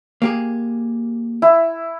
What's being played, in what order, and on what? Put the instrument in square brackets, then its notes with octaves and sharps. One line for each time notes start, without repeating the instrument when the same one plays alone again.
[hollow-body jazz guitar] A#3 G4 G#4
[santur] E4